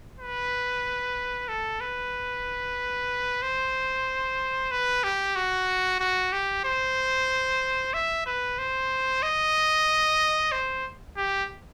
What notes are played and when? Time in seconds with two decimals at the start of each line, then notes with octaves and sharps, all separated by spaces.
0.19 B4
1.48 A4
1.81 B4
3.42 C5
4.71 B4
5.04 G4
5.36 F#4
6.00 F#4
6.32 G4
6.64 C5
7.93 E5
8.26 B4
8.58 C5
9.22 D#5
10.52 C5
11.17 G4